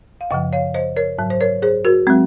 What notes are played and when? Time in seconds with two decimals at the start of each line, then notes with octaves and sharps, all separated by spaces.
0.21 F5
0.31 F#2 C#3 F3 D#5 F#5
0.53 C#5 F5
0.74 C5 D#5
0.96 A#4 C#5
1.19 G#2 F#3
1.30 C5
1.41 A#4 C#5
1.62 G#4 C5
1.85 F#4 A#4
2.07 F#3 G#3 C4